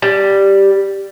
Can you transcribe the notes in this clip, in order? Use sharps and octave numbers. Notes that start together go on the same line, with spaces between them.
G3